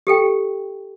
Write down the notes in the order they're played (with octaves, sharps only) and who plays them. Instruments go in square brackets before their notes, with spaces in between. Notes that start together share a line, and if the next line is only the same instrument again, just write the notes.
[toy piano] G4 A4 G5